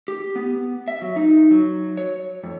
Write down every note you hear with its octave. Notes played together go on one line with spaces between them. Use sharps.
G4
B3
E5
F#3
D#4
F#3
C#5
F2